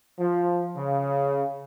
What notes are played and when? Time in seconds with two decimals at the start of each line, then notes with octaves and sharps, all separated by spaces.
0.18 F3
0.75 C#3